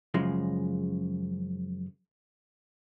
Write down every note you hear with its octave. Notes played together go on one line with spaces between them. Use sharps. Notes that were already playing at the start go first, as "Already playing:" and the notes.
F#2 C#3 F3 G#3